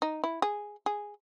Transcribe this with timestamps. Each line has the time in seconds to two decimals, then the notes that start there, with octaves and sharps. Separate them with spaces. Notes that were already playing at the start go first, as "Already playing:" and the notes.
0.02 D#4
0.24 E4
0.42 G#4
0.86 G#4